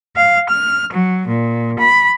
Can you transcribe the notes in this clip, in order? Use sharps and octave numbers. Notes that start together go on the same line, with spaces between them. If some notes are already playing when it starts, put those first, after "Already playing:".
F5
F6
F#3
A#2
B5